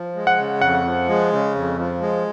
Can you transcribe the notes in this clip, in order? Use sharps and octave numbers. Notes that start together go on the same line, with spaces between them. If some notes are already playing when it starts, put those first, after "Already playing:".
Already playing: F3
G#3
F#5
C#3
F2 F#5
F3
G#3
C#3
F2
F3
G#3